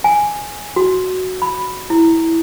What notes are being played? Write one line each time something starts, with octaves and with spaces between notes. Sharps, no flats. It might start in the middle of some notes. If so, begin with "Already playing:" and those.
G#5
F#4
B5
E4